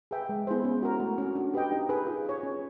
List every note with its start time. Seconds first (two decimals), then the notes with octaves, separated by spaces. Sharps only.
0.11 G#4 B4 E5 G5
0.29 G#3
0.47 B3 E4 G#4 C5
0.65 C#4
0.82 F#4 A#4
1.00 A3
1.18 C#4 F#4
1.35 D4
1.54 G4 B4 D#5 G5
1.72 D#4
1.89 G#4 B4
2.07 F4
2.25 G#4 C#5
2.43 C#4